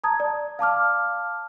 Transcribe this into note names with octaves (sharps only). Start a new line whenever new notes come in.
A5 A#5 D#6 G#6
D5
F5 A5 D6 F6